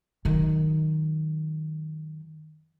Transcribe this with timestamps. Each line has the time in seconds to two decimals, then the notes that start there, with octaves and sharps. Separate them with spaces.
0.25 F#2 D#3